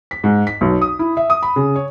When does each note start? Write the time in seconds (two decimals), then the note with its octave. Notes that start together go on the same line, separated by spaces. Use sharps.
0.11 B6
0.24 G#2
0.47 B6
0.61 B1
0.81 D#6
0.99 E4
1.17 E5
1.30 D#6
1.43 B5
1.56 C#3
1.76 C#5